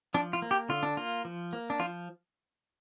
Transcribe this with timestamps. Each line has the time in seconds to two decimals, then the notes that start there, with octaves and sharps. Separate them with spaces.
0.14 F3 D4
0.33 F4
0.42 A#3
0.51 G4
0.69 D3 F4
0.83 D4
0.97 A#3 F4
1.25 F3
1.53 A#3
1.70 D4
1.80 F3 F4